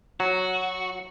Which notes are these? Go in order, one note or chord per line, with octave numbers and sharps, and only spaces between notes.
F#3 F#4